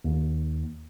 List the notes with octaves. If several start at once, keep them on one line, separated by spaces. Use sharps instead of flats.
D#2